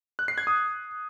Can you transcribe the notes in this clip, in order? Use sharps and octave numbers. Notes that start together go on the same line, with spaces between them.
F#6
C7
G#6
D#6